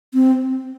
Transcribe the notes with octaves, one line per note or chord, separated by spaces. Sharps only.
C4